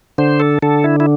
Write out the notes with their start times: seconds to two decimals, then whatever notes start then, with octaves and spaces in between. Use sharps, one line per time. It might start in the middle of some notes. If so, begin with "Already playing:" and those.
0.18 D3 C5
0.40 A4
0.62 D3 A4
0.84 E4
1.00 E4